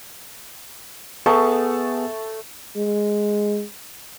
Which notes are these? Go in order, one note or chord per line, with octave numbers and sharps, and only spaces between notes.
A3 B3 G#4 A5 C#6
G#3